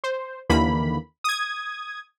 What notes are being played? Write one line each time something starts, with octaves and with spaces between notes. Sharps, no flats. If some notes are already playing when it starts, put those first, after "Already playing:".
C5
D#2 D3 E3 A#3 B5
D#6 G#6